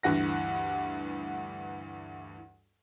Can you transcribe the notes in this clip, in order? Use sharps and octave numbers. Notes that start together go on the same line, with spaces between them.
D2 G2 E3 F#5 A#6